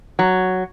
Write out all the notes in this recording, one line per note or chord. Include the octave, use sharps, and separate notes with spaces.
F#3